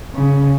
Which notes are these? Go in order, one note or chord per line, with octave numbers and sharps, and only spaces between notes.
C#3